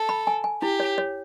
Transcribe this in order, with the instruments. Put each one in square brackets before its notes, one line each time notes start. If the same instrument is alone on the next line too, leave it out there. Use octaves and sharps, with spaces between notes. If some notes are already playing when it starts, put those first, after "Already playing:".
Already playing: [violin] A4
[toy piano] B5
G#5
G#5
[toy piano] E4 [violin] G4
[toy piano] C#5
C#5